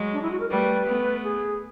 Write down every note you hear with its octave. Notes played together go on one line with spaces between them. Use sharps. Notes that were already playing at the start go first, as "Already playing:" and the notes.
Already playing: F#3 G#3
D4
E4
F#4
A#4
G3 A3 B4
A3 B3
G#4